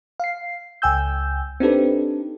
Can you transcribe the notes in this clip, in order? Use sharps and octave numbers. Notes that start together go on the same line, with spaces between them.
F5 C7
C#2 G5 G#5 E6 G6
C4 D4 D#4 G4 A4 B4